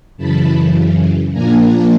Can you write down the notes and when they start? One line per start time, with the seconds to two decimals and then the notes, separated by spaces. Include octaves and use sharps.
0.17 F#2 C#3 E3 A5 B5
1.32 A#2 F3 A#3 D4 G#5 A#5